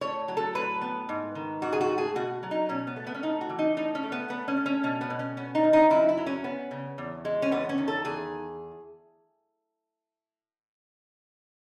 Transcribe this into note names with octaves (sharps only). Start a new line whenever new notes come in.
A2 C#5
F#3
A4
A2 B4
B3
G#2
D#3
G#2 F#4
G#4
F#4
A3
G#4
B2 F#4
F#3
D#4
B2 C#4
B3
A3
B3
C#4
A2 D#4
F#4
E3
D#4
A2 D#4
C#4
A3
B3
A3 B3
C#4
A3
C#4
B2 C#4
B3
B2
C#4
B3 C#4
D#4
D#3
D#4
F#2 E4
E4
F#3
C#4
B3
C#3
E2
G#3
C#4
E2 B3
C#4
D#3
A4
E2 G#4